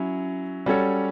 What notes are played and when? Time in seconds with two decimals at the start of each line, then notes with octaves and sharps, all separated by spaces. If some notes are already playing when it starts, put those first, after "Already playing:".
Already playing: F#3 C#4 E4
0.66 G3 C#4 F#4 A4 C#5